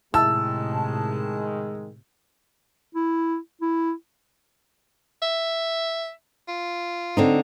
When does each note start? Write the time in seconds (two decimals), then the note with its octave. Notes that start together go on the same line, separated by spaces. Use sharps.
0.14 A2 C3 D#3 G#3 E4 A5 E6
2.95 E4
3.61 E4
5.22 E5
6.48 F4
7.17 D3 C4 D#4